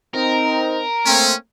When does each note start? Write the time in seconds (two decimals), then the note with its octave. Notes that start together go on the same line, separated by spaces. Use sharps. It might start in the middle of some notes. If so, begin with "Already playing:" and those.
0.14 C4 D#4 A#4
1.05 A3 A#3 C4 C#4